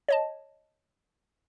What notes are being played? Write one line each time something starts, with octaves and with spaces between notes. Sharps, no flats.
C#5 D#5 A5